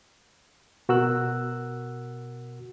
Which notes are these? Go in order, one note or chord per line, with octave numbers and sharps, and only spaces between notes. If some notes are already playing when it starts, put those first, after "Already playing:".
B2 F#4 A#4 E6 F#6